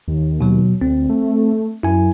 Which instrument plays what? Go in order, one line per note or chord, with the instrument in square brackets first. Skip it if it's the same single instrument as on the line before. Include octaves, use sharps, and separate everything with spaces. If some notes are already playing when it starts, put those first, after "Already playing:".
[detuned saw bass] D#2
[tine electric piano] B2 F#3
[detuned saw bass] D2 [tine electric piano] C4
[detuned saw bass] A3
[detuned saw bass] F#2 [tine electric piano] E4 G#5